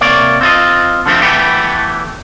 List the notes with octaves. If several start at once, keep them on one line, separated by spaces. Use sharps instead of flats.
C3 A#3 C#5 D5
C4 F4 D#5
D3 F3 A3 C4
E3 A3 B3 G4